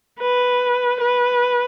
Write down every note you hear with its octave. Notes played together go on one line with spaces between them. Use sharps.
B4
B4